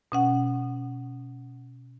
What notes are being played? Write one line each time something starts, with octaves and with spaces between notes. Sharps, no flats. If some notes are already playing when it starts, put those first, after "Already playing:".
B2 C#4 F#5